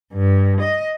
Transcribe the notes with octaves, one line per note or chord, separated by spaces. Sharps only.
G2
D#5